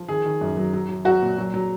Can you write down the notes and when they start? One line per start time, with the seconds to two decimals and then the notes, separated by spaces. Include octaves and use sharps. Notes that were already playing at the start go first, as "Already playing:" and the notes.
Already playing: F3
0.08 D#3 G#4
0.25 D#3
0.41 F#2
0.57 F#3
0.74 F#3
0.89 F#3
1.05 F#3 F#4
1.22 A#2
1.38 F#3
1.54 F#3